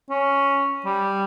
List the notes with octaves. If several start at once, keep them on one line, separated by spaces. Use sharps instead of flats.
C#4
G3